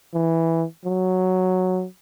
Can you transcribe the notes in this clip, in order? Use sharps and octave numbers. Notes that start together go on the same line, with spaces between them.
E3
F#3